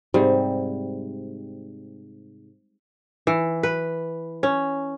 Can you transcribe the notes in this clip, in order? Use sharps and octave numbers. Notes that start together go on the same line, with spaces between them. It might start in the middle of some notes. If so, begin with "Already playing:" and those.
G#2 C3 G3
E3
B4
C#4